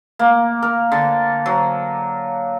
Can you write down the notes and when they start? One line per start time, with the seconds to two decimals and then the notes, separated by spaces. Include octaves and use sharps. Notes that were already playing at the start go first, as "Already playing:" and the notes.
0.19 A#3
0.62 A#4
0.92 D3
1.46 F#3